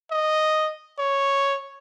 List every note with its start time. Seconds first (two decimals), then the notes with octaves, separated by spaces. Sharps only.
0.11 D#5
0.99 C#5